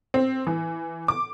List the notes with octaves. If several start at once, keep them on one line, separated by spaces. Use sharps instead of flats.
C4
E3
D6